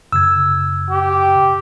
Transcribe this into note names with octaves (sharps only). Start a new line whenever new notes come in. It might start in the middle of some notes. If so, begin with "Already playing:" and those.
F#2 C#3 E6 G#6
G4